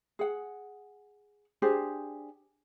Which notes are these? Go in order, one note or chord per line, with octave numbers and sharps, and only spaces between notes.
G#4 F#5
D4 G4 G#4 C5